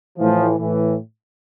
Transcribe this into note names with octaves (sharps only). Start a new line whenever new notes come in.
A2 E3 F3
A2 E3